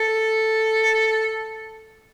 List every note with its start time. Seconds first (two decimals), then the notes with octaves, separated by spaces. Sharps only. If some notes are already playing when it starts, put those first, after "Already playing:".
Already playing: A4